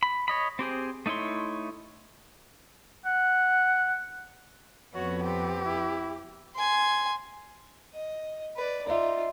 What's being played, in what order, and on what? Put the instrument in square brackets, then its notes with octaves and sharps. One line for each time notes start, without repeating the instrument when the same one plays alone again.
[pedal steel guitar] B5
C#5 D#5 B5
C4 G4 G#4 C5
A3 D#4 E4 C#5 C6
[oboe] F#5
[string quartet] F2 B3 [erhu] F#4 [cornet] C#5
[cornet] C4 [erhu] G4
[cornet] E4
[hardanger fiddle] G#5 C6
[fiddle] D#5
B4 D5
[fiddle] D#4 F4 [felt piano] D5 E5